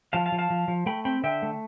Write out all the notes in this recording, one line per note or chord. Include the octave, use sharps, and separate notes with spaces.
F3 F5 A5
F5 A5
F3
F5 A5
F3
F3
A3 G5 B5
C4 G5 B5
D3 E5 G5
A3